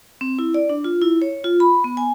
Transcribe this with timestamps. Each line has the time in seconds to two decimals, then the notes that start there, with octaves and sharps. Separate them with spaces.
0.21 C4
0.39 E4
0.54 D5
0.69 D4
0.84 F4
1.01 E4
1.22 C#5
1.44 F4
1.60 B5
1.84 B3
1.97 G#5